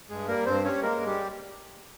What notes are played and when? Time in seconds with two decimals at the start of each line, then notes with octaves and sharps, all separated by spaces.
0.10 G2 G#3 G#4
0.28 G3 A#3 A#4
0.46 G2 C4 C5
0.64 G3 C#4 C#5
0.82 G#3 A#3 A#4
1.00 G2
1.06 G3 G4